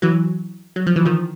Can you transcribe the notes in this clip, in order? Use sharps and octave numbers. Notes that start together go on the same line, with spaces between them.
E3 F#3
F#3
F3
E3
D#3 F3